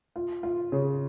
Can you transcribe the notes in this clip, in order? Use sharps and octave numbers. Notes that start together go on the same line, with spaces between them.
F4
F4
C#3